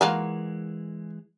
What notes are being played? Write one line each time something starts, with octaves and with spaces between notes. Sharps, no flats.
E3 G#3 A#3 F4 F#4